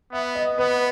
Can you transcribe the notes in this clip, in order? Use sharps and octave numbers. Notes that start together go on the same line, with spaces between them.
B3 E5
D#5
B3 B4